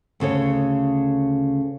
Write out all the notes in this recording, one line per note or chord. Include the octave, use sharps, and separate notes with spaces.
D2 C#3 A4 C#5